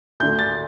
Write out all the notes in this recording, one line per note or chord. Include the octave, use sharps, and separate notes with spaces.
D2 D3 G6
A6